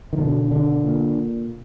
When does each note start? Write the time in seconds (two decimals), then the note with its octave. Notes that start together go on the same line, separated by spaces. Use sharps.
0.13 D#3
0.18 B2 D3
0.51 D3
0.84 A#2